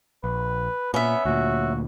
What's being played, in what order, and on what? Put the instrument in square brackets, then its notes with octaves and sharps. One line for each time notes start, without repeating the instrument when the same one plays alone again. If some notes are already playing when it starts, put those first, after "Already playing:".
[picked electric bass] A#1 [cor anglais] B4
[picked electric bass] A#2 [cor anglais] B3 [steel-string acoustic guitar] C#4 E5
[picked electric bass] D2 A#2 [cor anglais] F#4